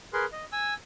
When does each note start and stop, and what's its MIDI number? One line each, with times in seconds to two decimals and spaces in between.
0.13 0.25 68
0.13 0.25 70
0.13 0.25 71
0.13 0.25 84
0.32 0.45 75
0.52 0.74 80
0.52 0.74 88